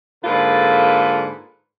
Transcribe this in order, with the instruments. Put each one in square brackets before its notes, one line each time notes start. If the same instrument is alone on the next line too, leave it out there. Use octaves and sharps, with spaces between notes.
[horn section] G#2 D3 A#3 F4 A4 B4